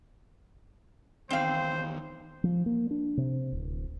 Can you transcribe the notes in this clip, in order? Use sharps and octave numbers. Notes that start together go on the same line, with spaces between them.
E2 D#3 C4 C5 F5
F3
A#3
D4
C3
D1